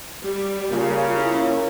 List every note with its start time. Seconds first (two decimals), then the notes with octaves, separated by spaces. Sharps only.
0.23 G3
0.71 C#3 A#3 F4
1.14 C#4 E4